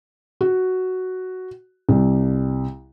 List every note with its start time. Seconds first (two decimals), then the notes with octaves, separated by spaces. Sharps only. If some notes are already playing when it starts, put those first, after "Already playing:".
0.41 F#4
1.89 C2